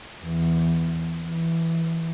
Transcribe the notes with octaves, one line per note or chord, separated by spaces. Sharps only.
E2
E3